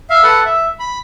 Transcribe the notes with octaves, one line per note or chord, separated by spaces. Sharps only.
E5 F5
A4 B4 F#5
E5
B5